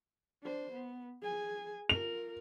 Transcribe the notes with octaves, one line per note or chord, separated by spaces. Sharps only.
D4 C5
B3
G#4 G#5
F4 A#4 F7